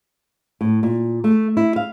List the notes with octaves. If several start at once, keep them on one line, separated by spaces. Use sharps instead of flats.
A2
A#2
A3
E4
F5